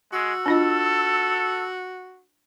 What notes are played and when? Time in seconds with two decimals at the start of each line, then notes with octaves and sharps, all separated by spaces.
0.13 G#3 F#4 E6
0.46 D4 F4 A4 D#5